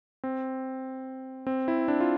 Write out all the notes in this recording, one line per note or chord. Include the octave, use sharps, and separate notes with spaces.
C4
C4
E4
D4
F4